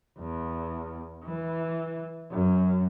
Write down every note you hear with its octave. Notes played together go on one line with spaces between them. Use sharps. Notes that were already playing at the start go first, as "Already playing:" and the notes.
E2
E3
F#2